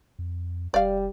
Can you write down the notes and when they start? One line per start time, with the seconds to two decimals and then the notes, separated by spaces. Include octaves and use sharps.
0.19 F2
0.74 F1 G3 D5 F5